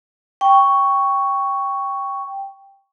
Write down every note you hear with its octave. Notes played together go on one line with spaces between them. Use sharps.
G5 C#6